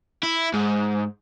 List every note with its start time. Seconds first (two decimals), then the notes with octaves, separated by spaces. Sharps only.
0.23 E4
0.54 G#2